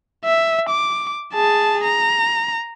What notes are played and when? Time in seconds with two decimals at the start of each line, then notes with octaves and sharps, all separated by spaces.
0.25 E5
0.69 D6
1.34 G#4 A5
1.84 A#5